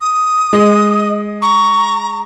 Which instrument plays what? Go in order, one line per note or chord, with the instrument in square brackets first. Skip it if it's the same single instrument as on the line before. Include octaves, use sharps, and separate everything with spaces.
[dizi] D#6
[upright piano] G#3 [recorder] D#5
[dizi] A#5 [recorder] C#6